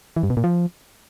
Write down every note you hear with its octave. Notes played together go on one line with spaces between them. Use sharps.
E3
G2
B2
A#2
F3